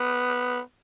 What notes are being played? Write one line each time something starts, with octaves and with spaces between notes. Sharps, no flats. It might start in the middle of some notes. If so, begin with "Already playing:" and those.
Already playing: B3